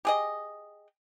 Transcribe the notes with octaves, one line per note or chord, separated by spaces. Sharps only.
G4 G#4 D#5